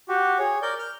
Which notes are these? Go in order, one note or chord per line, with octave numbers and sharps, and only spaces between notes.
F#4 G4
G#4 C#5
A#4 D5 G6
F6 G6